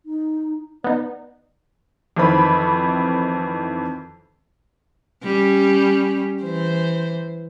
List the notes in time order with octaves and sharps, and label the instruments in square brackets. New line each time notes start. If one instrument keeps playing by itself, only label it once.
[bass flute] D#4
[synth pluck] B3 D#4 [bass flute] D5
[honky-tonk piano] F2 D#3 E3 C4 B5
[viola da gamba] G3 C#4
E3 C5